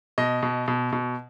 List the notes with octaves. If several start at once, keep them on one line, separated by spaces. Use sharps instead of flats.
B2 D#5
B2
B2
B2